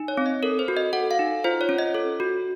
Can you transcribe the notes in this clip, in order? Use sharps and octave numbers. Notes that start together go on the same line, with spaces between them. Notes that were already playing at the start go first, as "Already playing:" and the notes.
Already playing: D#4
C#5
C4
D#5
A4 A#4
C5
F#4
D#5
A4 F#5
F5
D#4
F4 C5
C#5
C#4
D#5
A4
F#4